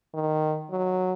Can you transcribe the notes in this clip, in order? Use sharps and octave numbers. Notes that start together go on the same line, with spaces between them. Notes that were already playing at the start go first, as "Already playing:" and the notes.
D#3
F#3